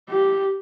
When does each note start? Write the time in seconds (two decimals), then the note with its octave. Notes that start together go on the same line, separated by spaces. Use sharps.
0.10 G4